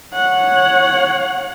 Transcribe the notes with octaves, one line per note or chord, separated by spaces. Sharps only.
C#5 F#5